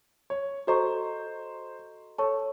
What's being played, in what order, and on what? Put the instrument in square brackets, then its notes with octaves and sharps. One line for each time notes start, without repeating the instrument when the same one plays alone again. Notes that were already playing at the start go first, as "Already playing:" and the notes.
[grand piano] C#5
[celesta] F#4 A4 D#5 A#5 C#6 [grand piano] C5
[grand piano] A4 [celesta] C#5 A5 C#6